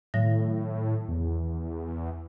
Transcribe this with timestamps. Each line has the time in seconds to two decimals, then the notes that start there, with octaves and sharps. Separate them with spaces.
0.14 A2 D#3 F#3 A#6
1.08 E2